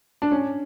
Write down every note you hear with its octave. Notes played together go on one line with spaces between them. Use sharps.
D4
C#4